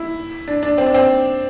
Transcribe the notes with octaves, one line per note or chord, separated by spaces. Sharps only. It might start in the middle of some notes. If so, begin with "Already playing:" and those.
Already playing: E4
D4
D4
C4
D4
C4